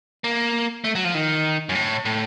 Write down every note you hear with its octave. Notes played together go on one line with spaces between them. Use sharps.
A#3
A3
F#3
F3
D#3
F#2
A2
A2